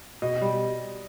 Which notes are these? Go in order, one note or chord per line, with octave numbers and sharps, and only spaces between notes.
B2 D#5
G3